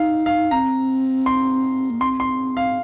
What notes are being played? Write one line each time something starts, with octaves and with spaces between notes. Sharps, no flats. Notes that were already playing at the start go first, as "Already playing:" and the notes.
Already playing: D#4 F5
F5
C4 A#5
C6
A#3
C4 C6
C6
F5